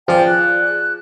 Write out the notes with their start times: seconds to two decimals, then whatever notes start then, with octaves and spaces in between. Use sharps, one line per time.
0.08 F3 F4 G#4 D5 G5
0.27 F#6